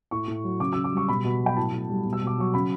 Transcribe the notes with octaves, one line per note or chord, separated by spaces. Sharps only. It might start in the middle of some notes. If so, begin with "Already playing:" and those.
A2 C#6
A2
F#3
C#3 D6
C#3 E6
D6
G3 C#6
B2 B5
B2
F#3
G5
A2 A5
A2
G3
B2
E6
B2 D6
F#3 C#6
C#3 B5